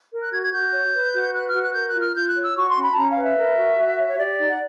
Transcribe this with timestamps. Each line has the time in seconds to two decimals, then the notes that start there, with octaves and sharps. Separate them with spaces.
0.12 A#4
0.22 F#6
0.31 F#4 G#6
0.42 G#6
0.53 F#4 G6
0.73 C#5
0.93 B4
1.13 F#4
1.33 B4 F#6
1.48 F6
1.54 F#4
1.61 F#6
1.74 A#4 G6
1.87 F#6
1.94 F4
2.01 F6
2.15 F4 G6
2.28 F#6
2.35 C#5
2.43 E6
2.55 F#4 C#6
2.69 C6
2.76 C#4
2.83 B5
2.92 A5
2.96 C#4 A#5
3.10 F5
3.16 B4
3.23 E5
3.37 A#4
3.57 F#4
3.77 F#4
3.98 C#5
4.09 C#5
4.18 G4 D5
4.39 D#4
4.47 F#5